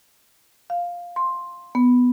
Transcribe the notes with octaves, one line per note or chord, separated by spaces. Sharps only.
F5
C6
B3